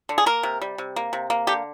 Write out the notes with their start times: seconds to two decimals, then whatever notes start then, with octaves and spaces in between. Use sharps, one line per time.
0.09 D3
0.18 G#4
0.26 A#3 A#4
0.43 C3
0.61 G3
0.78 C3
0.96 A#3
1.13 C3
1.30 A#3
1.47 D3 G4